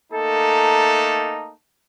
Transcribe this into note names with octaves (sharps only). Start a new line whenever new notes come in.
A3 A#3 D#4 A4